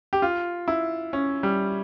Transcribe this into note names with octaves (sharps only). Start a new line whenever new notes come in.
G4
F4
E4
C#4
G3